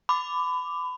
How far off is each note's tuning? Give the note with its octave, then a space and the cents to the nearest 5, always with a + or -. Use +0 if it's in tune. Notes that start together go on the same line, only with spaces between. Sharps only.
B5 +30 D6 +0